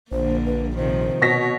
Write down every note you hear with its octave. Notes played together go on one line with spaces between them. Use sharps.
A#1 D3 A#3 C5
B4
C3 D#3 F3 C5
B2 C#5 A#6 B6